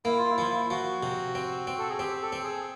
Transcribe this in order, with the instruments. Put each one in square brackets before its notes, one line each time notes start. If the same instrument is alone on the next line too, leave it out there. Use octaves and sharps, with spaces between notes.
[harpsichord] A#3 [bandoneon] E4
[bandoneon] F4
E4
[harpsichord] F3 [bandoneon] F4
[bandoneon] E4
[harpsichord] F3 [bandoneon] F#4
[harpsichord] C3
C4
C4
[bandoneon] A4
G#4
[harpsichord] C4 [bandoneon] G4
[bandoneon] A4
[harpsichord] C4
[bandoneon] G#4